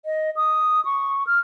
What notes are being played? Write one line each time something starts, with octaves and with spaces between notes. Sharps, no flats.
D#5
D#6
C#6
F6